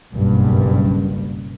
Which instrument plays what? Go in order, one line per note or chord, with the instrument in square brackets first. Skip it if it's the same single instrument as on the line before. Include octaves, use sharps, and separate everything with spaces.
[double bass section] F#1 B1 G2